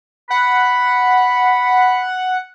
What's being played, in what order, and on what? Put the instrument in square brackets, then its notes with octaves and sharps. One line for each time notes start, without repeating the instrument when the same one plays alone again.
[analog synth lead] F#5 [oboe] B5